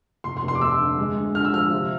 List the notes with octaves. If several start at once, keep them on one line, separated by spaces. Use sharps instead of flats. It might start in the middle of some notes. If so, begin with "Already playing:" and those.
F1 C6
C6
F1
C6
D6
A3 E6
D3
G#3
D2
D3 F6
E6
F3 F6
C3